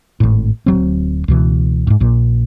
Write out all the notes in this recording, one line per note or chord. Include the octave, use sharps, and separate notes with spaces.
G#1 A2
D1 F#3 C4
C#2 B2 E3
F2 G#2
A#1 A#2